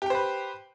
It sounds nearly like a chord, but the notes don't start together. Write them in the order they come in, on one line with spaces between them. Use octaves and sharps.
G4 G5 C5 B4